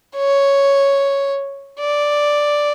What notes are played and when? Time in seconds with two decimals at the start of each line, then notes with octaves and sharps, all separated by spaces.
0.16 C#5
1.80 D5